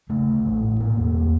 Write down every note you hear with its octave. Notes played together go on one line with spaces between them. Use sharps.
C#3 A3
D2
A1
A2
B2 A#3
E2